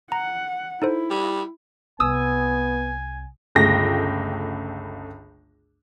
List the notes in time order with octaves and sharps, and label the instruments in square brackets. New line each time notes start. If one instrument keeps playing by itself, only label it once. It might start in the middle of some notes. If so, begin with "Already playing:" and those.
[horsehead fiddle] F#5 [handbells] A#5
[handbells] D#4 A4 C5 [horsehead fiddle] E4
[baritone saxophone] G3
[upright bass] C2 [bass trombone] B3 [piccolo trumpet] G#5 [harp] D#6 E6
[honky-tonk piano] G1 C#2 A3 G5 A#6